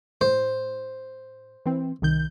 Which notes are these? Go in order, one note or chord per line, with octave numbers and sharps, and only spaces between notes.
A2 C5
E3 C4
C2 D#3 G6